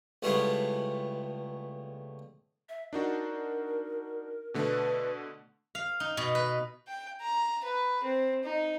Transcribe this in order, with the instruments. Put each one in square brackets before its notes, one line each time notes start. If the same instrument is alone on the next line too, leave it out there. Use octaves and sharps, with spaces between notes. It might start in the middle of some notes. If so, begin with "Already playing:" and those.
[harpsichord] C#2 G3 A3 B3 E4 C6
[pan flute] E5
[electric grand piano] D4 D#4 F#4 [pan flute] A#4
[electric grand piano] B2 D3 A3 [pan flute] B4
[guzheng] F5
D#4
B2
B4
[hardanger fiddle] G5
A#5
B4
C4
D#4